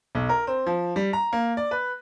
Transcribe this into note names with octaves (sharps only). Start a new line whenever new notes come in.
B1
A#4
C4
F3
G3
A#5
A#3
D5
B4